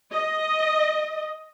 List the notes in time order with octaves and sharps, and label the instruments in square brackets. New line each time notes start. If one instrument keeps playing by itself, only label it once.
[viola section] D#5